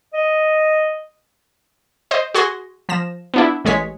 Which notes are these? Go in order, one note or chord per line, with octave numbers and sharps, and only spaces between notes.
D#5
C5 D#5
F#4 G#4 C6 G#6 A#6
F3 A#6 E7
B3 D4 E4
A1 G#3 C#5 B6